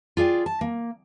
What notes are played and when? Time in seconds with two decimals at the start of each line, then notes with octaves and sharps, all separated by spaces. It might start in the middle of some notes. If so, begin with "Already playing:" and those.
0.17 F4 G#4 D5 G5
0.46 A5
0.61 A#3